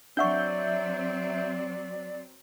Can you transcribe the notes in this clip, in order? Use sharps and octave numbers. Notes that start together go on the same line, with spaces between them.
F#3 C4 D4 D5 E5 F#5 C#6 G6